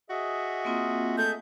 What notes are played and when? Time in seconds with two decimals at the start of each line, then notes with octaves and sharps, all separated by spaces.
0.10 F#4 G#4 D#5 E5
0.65 A#3 C4 F4
1.18 A3 G6